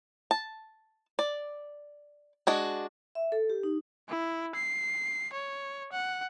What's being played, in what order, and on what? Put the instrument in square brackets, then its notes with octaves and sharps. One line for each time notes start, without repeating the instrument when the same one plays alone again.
[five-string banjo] A5
D5
G#3 D4 F#4
[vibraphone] E5
A4
G4
D#4
[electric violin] E4
C7
C#5
F#5